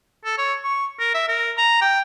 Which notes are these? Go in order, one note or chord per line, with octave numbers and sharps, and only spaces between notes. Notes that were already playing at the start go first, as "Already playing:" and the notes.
A4
C#5
C#6
A#4
E5
A#4
A#5
G5